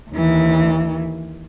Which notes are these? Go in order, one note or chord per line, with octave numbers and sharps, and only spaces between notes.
D#2 E3